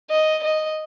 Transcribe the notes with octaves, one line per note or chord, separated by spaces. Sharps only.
D#5
D#5